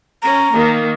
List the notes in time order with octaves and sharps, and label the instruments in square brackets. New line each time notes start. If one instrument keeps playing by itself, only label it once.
[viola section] C#4 [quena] A#5
[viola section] D#3 A#3